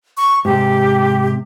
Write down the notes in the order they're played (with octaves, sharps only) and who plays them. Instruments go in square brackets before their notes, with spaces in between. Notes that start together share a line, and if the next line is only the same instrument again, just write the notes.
[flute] C#6
[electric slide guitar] G#2 C3 [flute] G4